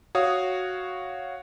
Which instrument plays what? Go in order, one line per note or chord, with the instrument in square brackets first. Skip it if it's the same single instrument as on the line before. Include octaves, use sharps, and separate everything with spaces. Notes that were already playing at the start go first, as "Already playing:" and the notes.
[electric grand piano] F#4 C#5 F5 D#6